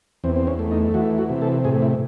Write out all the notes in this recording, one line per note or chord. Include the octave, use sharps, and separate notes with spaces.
E2 C4
C4
C#4
A3
D#4
E3 F#4
F#4
C3
A4
A2 G#4
E4